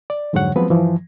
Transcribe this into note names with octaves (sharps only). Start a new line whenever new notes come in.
D5
F2 G#2 D3 F#3 C#5 F#5
F3 F#3 G#3 B3 C4 B4
G2 E3 F3